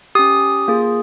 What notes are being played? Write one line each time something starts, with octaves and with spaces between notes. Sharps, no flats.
C#4 G4 D#6
A#3 F4 G#4